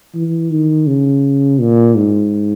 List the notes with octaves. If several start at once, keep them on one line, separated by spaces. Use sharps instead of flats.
E3
D#3
C#3
A#2
G#2